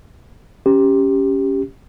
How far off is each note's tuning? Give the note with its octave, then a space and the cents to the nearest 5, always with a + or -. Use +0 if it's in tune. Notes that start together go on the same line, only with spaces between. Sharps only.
C#4 +0 G4 +0